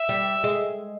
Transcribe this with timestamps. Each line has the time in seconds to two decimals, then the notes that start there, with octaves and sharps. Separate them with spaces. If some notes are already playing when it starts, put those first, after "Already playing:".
Already playing: E5
0.09 G3
0.44 G#3